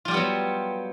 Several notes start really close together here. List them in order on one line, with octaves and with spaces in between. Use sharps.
F4 G3 G4 B3 F#3